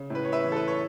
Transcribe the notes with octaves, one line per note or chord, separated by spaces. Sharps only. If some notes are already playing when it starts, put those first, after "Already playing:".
Already playing: C#3
A2 B4
C#5
B4 E5
E3
A4
B4
C#5